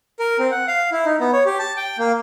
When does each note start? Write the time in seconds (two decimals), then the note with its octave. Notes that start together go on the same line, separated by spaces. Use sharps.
0.19 A#4
0.39 C4
0.52 F#5
0.68 F5
0.92 E4
1.06 D#4
1.20 B3
1.33 C#5
1.46 G4
1.59 A5
1.77 G5
1.98 A#3